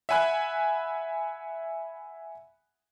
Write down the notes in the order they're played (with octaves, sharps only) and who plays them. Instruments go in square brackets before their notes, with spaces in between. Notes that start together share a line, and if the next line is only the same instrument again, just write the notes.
[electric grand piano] E5 F#5 G#5 B5 F#6